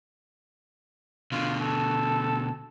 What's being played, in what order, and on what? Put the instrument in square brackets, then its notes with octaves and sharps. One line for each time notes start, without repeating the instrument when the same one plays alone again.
[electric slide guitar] B2 D3 [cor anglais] F4
[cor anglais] A4